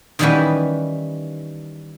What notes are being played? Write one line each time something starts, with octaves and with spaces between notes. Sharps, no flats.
D#3 E3 G3 C#4 F#4 B4